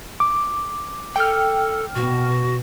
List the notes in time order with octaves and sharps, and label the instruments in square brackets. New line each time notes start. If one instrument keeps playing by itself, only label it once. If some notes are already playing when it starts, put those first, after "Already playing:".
[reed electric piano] D6
[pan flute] A4 [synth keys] G5 F6
[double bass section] B2 [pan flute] F#4